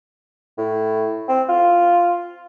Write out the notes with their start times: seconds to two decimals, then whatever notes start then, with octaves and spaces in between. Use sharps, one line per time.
0.58 A2
1.28 C4
1.49 F4